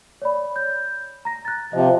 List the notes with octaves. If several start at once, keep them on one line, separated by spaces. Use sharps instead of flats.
C#5 D5 B5
G6
A#5 A#6
F#6 A6
C3 F3 D#5